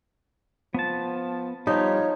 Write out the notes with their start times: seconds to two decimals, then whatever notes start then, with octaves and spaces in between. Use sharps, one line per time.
0.74 F3 B3 A5
1.67 F3 G3 D#4 G4 C#5